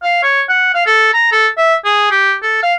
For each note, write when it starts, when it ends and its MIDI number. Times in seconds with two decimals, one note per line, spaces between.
0.03 0.19 77
0.23 0.42 73
0.49 0.74 78
0.74 0.82 77
0.86 1.11 69
1.14 1.28 82
1.32 1.48 69
1.58 1.75 76
1.84 2.07 68
2.11 2.34 67
2.42 2.59 69
2.63 2.74 77